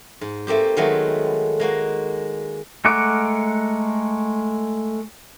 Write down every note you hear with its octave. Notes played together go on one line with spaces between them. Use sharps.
G#2
A3 A#3 C4 G4
D#3 F#3 G#3 A3 B3
G#3 A#3 F#4
G#3 A3 A#4 F#5 D6